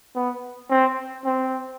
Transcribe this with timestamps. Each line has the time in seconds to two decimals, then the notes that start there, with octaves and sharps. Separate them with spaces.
0.15 B3
0.70 C4
1.25 C4